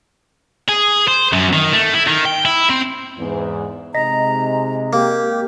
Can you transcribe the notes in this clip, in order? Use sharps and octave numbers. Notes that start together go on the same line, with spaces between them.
G#4
C5
F#2
D#3
A3
E4
D#3
G5
E4
C4
E2 G#2
C3 G#3 D#4 D#5 A#5 A#6 B6
A#3 G4